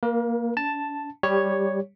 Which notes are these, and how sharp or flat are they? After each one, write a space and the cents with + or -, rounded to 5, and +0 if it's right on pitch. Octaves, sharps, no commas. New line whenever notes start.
A#3 +0 A#4 +40
D4 -45 A5 +0
G3 +0 G4 +20 C#5 +0